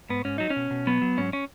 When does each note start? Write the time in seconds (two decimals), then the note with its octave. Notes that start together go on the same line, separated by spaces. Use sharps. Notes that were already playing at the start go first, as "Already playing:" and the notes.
0.09 G#2 B3
0.25 G#2 C#4
0.38 F#3 D#4
0.50 C#4
0.56 B2
0.71 B2
0.87 F#3 B3
1.02 F#3
1.17 G#2 C#4
1.33 C#4